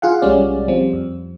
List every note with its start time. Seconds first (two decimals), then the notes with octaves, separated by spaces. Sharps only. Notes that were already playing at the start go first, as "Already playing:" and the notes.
0.02 F4 G#4 F5 F#5
0.22 B1 G3 G#3 C#4 D5
0.68 F3 G3 C4
0.93 F2